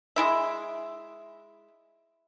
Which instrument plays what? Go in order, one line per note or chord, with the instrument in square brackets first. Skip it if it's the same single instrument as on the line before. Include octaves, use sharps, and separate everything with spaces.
[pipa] G#3 E4 E5